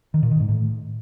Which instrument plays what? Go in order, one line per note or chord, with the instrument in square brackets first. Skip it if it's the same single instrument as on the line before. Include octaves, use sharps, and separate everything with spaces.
[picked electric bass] D#3
A#2
D#3
G#2
A2